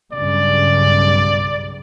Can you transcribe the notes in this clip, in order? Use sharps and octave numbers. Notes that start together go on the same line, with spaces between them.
B1 G2 C#3 D5